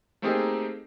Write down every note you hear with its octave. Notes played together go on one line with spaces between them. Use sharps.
A3 A#3 C4 D#4 G4 G#4